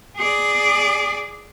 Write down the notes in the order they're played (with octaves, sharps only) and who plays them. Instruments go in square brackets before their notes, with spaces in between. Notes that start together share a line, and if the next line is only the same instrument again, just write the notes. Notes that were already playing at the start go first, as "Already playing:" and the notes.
[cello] G#4 D5